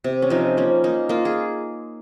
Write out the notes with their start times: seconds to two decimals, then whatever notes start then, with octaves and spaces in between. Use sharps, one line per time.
0.04 C3
0.22 C#4
0.30 F3 D#4
0.57 A#3 C#4
0.84 A#3 D#4
1.09 A#3 F4
1.25 G#4